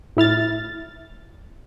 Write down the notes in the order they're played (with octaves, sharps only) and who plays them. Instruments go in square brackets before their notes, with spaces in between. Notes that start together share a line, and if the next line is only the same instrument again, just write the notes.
[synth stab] A2 E4 F6 A6